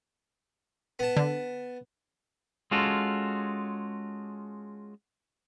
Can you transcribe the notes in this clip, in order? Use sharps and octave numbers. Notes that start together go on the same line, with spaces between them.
B3 A5
D3
G#3 C#4 F4 F#4 A4